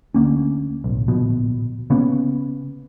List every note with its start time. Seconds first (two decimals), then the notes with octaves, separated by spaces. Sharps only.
0.14 D2 A#3 C#4
0.84 D1 B1
1.08 D1 A#1 B2
1.90 C#3 A#3 B3 C#4